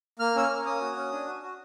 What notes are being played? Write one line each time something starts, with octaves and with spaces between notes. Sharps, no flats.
A#3 F6
C#4 E6
F6
A#3
C#4 D#6
F#4
C#4
D4
F#4
F#4